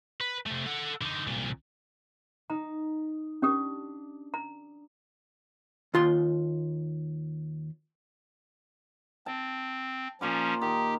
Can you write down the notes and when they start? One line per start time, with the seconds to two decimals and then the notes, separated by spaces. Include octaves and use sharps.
0.21 B4
0.46 C3 A3
0.67 A4 F#5
1.01 D3 D#4
1.27 C2 A#2
2.50 D#4 A#5
3.42 C#4 D4 G4 D#6
4.34 A#5
5.94 D#2 F4 C6
9.26 C4 A5
10.21 A#2 F3 C#4 F4 D6
10.61 D#3 G4